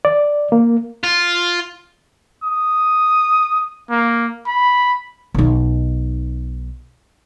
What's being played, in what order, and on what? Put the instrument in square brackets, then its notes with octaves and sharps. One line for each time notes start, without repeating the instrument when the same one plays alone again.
[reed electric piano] D5
A#3
[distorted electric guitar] F4
[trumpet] D#6
A#3
B5
[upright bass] B1 D#4